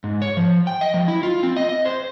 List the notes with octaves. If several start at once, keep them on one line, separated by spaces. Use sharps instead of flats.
G#2
C#5
F3
G5
D#5
F3
E4
F4
C4
D#5
D#5
C5